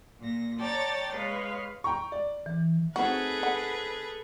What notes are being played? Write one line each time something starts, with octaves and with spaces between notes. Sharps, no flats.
A#2 A#6
C#5 D5 G5 A5 A#5 A6
G#3 B4 C#5 F5
G5 A#5 C#6
D5
E3
A3 C4 D#4 F#4 G#4 A4 B4
F#5